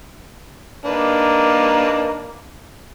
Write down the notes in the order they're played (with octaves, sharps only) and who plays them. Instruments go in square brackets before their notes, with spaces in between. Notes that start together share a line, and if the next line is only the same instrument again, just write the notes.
[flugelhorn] A#3 [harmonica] D4 D#4 B4